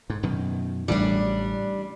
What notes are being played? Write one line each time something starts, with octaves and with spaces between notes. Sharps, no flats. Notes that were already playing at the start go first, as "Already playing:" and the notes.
G#2
F#2 B2 D#3
A1 A2 C#3 G3 D4